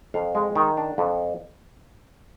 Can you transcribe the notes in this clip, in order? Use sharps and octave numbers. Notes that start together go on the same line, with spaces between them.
F2 F5
G#3
D#3
D4
F2